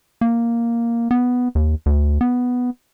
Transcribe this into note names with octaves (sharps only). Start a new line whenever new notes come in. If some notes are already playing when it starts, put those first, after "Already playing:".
A#3
B3
D#2
D2
B3